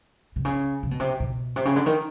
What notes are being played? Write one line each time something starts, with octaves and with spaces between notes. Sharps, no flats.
C3
C#3
C3
B2
C3
B2
C3
C#3
D3
D#3